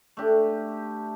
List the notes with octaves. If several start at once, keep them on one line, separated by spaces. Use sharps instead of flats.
A3 D4 G4